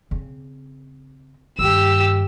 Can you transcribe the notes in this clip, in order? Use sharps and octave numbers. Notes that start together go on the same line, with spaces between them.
C#3 C4
G2 D#3 G4 E6